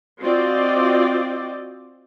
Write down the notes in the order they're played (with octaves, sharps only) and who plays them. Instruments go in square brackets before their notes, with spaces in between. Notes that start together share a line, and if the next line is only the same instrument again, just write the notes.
[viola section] C4 F4 F#4 D5 D#5